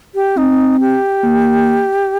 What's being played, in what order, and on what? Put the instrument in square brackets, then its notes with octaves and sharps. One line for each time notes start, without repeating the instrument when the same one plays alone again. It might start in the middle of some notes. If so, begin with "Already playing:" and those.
[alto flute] G4
[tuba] C4 [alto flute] D#4
[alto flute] G4
[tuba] A#3